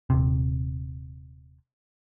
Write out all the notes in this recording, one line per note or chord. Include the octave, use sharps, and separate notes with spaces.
D#1 C3